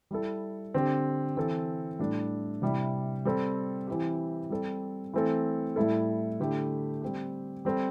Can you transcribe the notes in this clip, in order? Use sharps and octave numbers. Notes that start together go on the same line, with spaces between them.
G3 E4 A4
D3 C4 G4
E3 C4 A4
A2 G3 D4 A4
C3 G3 E4 G4
G3 C4 A4
E3 C4 E4 G4
G3 C4 A4
E3 A3 C4 A4
A2 G3 E4 A4
D3 A3 E4 G4
G3 C4 G4
G3 C4 A4